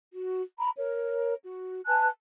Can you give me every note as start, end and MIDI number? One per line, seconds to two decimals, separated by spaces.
0.13 0.41 66
0.58 0.70 82
0.58 0.70 83
0.78 1.34 70
0.78 1.34 73
1.44 1.81 66
1.87 2.08 71
1.87 2.08 80
1.87 2.08 81
1.87 2.08 90